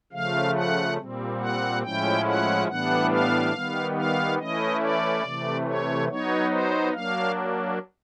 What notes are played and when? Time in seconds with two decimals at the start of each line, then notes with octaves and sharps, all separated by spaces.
0.12 C#3 F3 A3 F5
0.55 F#5
0.98 A#2 G3 C4
1.40 F#5
1.83 A2 F3 G#3 C#4 E4 G5
2.25 F#5
2.68 A2 E3 G3 B3 D4 F#5
3.11 F5
3.54 D#3 G3 B3
3.96 F5
4.38 E3 A3 C#4 E4 D#5
4.81 D5
5.23 C3 E3 A3
5.66 C#5
6.09 F#3 B3 D#4 C#5
6.51 C5
6.94 F#3 A#3 D4 F5